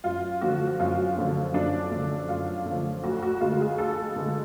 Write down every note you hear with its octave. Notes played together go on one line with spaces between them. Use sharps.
F#2 F4
D3 F3 F#4
F#4
F#2 F4
D3 F3
F#2 D4
D3 F3
F#2 F4
D3
F3
D2 F#4
F#4
D3 G#3 F4
G#4
D2 A4
D3 G#3